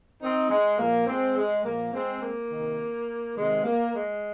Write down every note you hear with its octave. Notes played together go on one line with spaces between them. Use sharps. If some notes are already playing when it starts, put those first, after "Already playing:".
C4 D#4
G#3
A#2 F3 A#3
G#3 C4
G#3
A#2 F3 A#3
G#3 C4
A#3
C3 D#3
C3 D#3 G#3
A#3
G#3